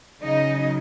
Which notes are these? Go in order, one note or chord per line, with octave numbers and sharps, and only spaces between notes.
C#3 F#3 D#4 D#5